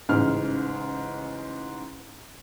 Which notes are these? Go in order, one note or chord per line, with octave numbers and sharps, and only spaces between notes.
A1 G#2 C#3 F6